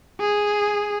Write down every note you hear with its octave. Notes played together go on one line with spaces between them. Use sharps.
G#4